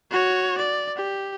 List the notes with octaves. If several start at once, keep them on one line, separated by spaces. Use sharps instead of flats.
F#4 C#5
D5
G4